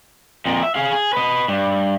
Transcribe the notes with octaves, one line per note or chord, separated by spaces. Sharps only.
F2 A#2
E5
G#4 F5
G#4
B4 D#5
G2